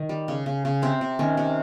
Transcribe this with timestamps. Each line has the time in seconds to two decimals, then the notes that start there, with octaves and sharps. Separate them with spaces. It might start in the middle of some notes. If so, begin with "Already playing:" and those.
Already playing: D#3
0.09 G3
0.28 C#3
0.46 C#3
0.65 C#3
0.82 C3 C4
1.01 C3
1.19 D#3 C#4
1.37 C3